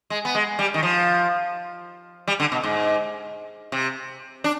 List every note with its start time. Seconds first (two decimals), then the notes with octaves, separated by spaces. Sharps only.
0.10 G#3
0.25 B3
0.35 G#3
0.59 G3
0.74 D#3
0.83 F3
2.27 G3
2.40 D3
2.52 B2
2.63 G#2
3.72 C3
4.44 D4